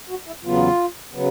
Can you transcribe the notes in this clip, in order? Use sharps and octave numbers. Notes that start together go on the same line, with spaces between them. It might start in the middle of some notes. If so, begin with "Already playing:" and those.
F#4
E4
E2 C#3 F#3 B3 F4
C#3 F#3 B3